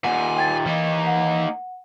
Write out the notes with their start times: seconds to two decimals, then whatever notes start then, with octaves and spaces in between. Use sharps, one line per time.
0.04 D#2 A#2 F#5 G#5
0.37 G5 G#6 A6
0.66 E3 A#3 D#4
1.07 F#5